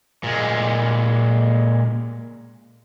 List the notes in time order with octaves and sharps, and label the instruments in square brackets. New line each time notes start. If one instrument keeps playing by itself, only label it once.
[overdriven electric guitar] A#2 G#3